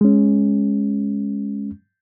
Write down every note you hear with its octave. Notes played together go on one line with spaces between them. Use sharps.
G#3 C#4